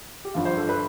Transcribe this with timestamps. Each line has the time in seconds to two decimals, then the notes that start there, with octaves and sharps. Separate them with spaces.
0.25 G4
0.34 G1 G2 F3 F4
0.45 C5
0.57 A4
0.69 B4